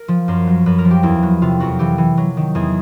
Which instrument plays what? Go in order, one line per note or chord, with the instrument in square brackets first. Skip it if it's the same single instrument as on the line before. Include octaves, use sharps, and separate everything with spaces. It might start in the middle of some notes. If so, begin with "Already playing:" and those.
Already playing: [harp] A#4
F3
F#2 C5
F#3
F#2 B4
A#4
F3
G4
E2 E4
F#3
C3 F4
F2 F#4
E3 G4
E3
F#3
D#3
E2 G#4